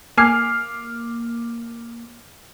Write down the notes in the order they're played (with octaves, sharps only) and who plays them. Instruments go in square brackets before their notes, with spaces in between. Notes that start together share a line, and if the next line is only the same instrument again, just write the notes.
[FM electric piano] A#3 [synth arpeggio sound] G#5 [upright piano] D6 F6 C7